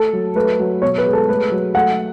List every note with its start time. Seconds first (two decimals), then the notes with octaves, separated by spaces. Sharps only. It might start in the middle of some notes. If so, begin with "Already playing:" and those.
Already playing: A3 A4
0.13 F#3
0.36 A3 B4
0.60 F#3
0.82 B2 C#5
0.98 B4
1.06 G#3 G#4
1.13 A4
1.29 A3 B4
1.52 F#3
1.75 A3 F#5